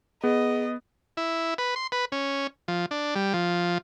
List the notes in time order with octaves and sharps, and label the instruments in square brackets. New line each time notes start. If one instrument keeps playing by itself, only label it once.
[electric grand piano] B3 [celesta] G#4 [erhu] D#5
[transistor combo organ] E4
B4
C6
B4
C#4
F3
D4
G3
F3